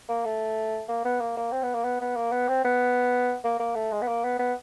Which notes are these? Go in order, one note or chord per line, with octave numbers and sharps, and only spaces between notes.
A#3
A3
A#3
B3
A#3
A#3
C4
B3
A#3
B3
B3
A#3
B3
C4
B3
A#3
A#3
A3
G#3
B3
A#3
B3
B3